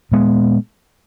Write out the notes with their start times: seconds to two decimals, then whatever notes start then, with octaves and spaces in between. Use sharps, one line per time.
0.12 A#2 G#3 B3